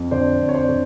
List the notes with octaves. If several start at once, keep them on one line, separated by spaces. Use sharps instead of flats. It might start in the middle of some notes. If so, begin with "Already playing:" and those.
Already playing: F2
D3 C5 D5
F2
C#5
C5 D5
D3